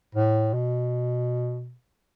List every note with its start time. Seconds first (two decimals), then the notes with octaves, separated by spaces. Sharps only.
0.15 A2
0.53 B2